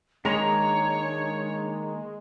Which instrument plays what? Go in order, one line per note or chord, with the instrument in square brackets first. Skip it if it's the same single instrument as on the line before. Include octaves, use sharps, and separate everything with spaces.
[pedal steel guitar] D#3 A#3 A#5 [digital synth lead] G#3 [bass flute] D4 [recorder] C#5